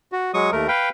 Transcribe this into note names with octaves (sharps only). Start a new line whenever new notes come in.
F#4
F#3 G#3 C#6 D#6
D#2 A3 A#4
B4 F5 G5